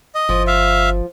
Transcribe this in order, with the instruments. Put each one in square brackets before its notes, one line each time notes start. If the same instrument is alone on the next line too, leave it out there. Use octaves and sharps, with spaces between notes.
[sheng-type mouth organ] D#5
[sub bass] G1 [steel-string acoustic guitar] F3
[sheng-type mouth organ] E5 F5